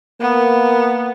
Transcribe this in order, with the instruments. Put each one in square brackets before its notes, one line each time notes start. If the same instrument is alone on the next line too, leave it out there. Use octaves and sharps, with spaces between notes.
[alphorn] A#3 [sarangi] B3